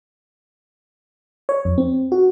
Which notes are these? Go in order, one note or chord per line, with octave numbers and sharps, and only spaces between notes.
C#5
F2
C4
F#4